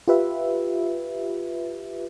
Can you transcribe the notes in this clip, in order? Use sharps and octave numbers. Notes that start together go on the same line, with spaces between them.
F4 G4 B4 E5